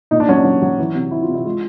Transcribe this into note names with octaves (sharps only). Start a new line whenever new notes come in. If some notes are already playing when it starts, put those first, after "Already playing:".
A#2 D#4
D4
F#3 C#4
D4
F#3
F#3
E3
C3
E3 E4
F4
C3
E4
G#3 F4